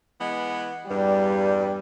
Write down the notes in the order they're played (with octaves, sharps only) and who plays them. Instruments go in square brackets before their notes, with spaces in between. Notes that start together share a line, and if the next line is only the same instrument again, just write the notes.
[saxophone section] E3 G#3 B3
[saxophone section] E2 G2 [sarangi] G3